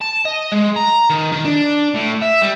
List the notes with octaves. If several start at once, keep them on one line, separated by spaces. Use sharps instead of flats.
A5
D#5
G#3
A#5
D#3
D#3
D4
A2
E5
G3